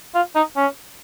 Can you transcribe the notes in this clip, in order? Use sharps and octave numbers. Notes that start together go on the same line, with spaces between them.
F4
D#4
C#4